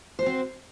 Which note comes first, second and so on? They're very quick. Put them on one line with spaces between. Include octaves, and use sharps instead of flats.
C5 F#4 C4